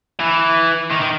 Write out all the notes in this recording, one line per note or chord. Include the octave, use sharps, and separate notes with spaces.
E3
D#3
D#3